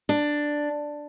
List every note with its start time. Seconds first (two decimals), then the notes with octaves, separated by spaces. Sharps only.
0.09 D4